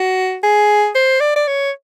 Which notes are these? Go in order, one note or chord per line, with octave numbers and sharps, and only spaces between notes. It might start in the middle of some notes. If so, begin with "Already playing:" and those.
Already playing: F#4
G#4
C5
D5
D5
C#5